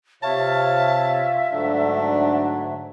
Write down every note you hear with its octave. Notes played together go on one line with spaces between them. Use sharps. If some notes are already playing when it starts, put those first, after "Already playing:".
C3 F4 C#5 E5 F5 A5
G#2 D3 F#3 A3 D4